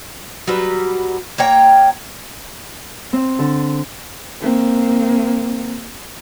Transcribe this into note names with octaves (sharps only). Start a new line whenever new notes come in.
F#3 G3 B4
A#3 C#5 G5 A#5
C4
D3
A#3 C4